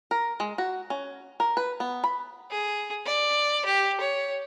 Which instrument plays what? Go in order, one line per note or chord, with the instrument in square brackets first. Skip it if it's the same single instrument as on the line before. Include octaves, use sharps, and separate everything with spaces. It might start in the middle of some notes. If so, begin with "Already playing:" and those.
[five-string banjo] A#4
G#3
F#4
C#4
A#4
B4
B3
B5
[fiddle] G#4
D5
G4
C#5